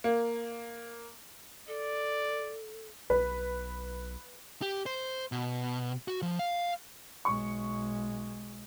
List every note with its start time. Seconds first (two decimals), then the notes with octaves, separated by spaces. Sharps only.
0.04 A#3
1.68 A4 D5
3.10 B1 B4
4.62 G4
4.86 C5
5.32 B2
6.08 F#4
6.22 F3
6.39 F5
7.25 B1 G#3 C#6